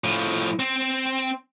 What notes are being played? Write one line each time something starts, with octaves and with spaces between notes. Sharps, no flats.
A2 F3
C4